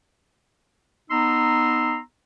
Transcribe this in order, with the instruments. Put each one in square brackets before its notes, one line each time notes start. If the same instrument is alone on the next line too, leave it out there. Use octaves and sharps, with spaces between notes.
[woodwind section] B3 D#4 A#5 C6 E6